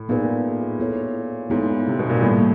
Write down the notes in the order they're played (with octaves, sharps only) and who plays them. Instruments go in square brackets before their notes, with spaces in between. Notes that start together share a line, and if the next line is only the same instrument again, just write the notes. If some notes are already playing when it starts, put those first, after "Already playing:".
Already playing: [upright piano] A2
[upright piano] A#2 [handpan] B3 D#4 G#4 B4
[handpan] B3 E4 A4 C#5
[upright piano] G#2 [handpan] B3 E4 A4 C#5
[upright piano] C3
B2
A#2
[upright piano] A2 [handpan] D#3 G3 A#3